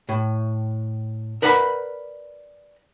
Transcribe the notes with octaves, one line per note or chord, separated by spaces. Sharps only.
A2
A#4 B4 D5 F#5 A5 B5